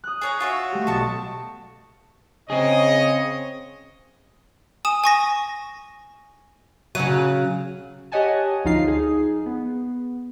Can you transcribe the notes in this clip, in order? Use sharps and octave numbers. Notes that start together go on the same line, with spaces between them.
D#6 F#6
G#4 C#5 A#5
F4 F#4 C#5 E5
A3 G4
B1 D#5 A5 C#6
C#3 C4 G#4 C#5 D#5
G#5 D#6 E7
G#5 C#6 A#6
C#3 F#3 D#7
G4 C#5 D#5 F#5 G#5 A5
D2 F3 D#4 F4 F5 C7
D#4 G#4
B3